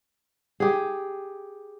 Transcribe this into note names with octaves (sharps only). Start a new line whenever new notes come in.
G4 G#4